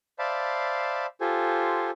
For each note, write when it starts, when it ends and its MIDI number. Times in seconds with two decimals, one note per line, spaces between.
0.19 1.06 72
0.19 1.06 74
0.19 1.06 76
0.19 1.06 77
0.19 1.06 81
0.19 1.06 83
1.21 1.90 65
1.21 1.90 67
1.21 1.90 69
1.21 1.90 72
1.21 1.90 80